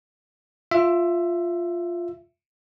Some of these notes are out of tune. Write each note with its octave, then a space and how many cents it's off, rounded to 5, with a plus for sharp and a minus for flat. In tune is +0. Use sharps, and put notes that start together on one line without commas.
F4 +0 E5 +15